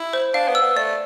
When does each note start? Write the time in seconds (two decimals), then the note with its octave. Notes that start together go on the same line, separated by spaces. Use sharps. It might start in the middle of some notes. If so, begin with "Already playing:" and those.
Already playing: E4
0.13 C5
0.34 D4 F5
0.48 B3
0.55 E6
0.62 B3
0.76 A3 D5